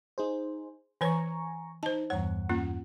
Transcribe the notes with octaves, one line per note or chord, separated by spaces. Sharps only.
D#4 G#4 C5
E3 B4 C#5 G#5 A#5 C#6
D#4 C5 A5
E2 G2 C#5 F#5
A#3 C#4 F4